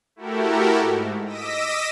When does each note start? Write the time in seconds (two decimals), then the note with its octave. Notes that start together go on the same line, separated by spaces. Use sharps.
0.16 A3 E4 F#4 G4 A4 A#4
0.78 G#2
1.26 D#5 D6 E6 A#6 B6 D#7